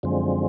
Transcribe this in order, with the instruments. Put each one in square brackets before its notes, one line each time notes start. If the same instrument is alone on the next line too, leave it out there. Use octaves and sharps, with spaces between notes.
[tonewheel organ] F#2 D3 F3 G#3 C4